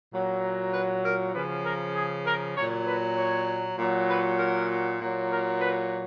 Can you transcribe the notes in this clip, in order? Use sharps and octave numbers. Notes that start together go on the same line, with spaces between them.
A#2 F#3
B4
A#4
C#3 F3 B4
A#4
G#4
A#4
A#2 F#3 C#5
B4
C#5
A#2 F#3
B4
A#4
A#2 F#3
A#4
B4